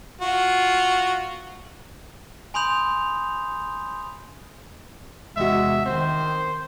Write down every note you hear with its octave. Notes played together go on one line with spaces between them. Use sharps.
F4 F#4
G#5 B5 C6 D#6 G6 F7
E2 C3 G#3 F#4 E5
D#3 C4 C5